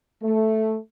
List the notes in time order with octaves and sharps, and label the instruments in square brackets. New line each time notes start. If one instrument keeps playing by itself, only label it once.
[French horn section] A3